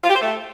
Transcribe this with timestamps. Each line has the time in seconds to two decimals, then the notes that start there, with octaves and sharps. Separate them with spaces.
0.04 F4
0.10 G4
0.15 C5
0.21 A3